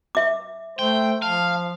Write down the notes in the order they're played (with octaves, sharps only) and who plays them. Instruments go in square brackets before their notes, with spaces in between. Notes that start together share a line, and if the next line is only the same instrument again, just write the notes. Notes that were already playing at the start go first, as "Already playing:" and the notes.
[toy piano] E5 D6
[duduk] A3 [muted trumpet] C5 [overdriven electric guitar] G5
[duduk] F3 [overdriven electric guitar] F5 [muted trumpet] A5